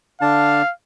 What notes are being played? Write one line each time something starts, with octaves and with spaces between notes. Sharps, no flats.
D3 D4 F5 A5